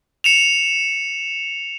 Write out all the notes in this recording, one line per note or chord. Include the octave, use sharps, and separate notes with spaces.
C#7 E7 F7